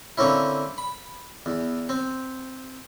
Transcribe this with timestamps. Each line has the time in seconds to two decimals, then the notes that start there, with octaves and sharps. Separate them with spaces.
0.18 D3 A#3 C4 C#4 E4
0.78 B5
1.46 E2
1.89 C4